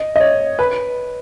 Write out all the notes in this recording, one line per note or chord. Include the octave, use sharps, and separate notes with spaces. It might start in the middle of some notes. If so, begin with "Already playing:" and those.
Already playing: D#5
D#5
C#5
B4